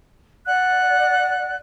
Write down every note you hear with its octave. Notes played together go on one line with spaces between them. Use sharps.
D5 F#5 F#6